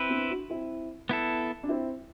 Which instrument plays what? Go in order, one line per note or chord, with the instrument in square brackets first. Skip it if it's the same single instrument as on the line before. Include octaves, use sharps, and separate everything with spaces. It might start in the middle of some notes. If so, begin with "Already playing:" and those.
Already playing: [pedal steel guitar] C4 E4 B4
[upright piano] B3 D4
D4 F#4
C4 E4
[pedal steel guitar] B3 E4 A4
[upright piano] D4
C4 E4